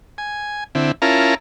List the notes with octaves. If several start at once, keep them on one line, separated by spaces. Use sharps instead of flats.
G#5
D3 C4 E4
C#4 E4 F4 A#4 A5 A#5